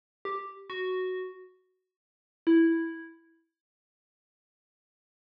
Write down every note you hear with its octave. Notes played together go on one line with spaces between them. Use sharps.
G4
F#4
E4